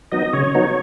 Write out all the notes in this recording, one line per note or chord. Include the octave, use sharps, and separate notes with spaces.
F#3 B3 D#4 D#5
C#3 C#5
F#3 B3 D#4